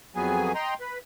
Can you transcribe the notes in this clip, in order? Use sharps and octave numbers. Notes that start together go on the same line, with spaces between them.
F2 F#3 B3 G#4 G#5
D#5 G5 A#5 C6
B4